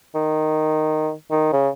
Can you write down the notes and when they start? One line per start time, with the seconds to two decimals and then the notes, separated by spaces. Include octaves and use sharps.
0.15 D#3
1.31 D#3
1.53 C#3